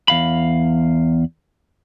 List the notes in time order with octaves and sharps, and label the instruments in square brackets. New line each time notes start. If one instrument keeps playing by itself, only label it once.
[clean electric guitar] E2 F5 B5